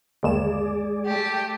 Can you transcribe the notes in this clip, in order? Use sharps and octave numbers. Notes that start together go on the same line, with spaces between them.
G1 D#2 G#3 G#4 D5 E7
A3 G4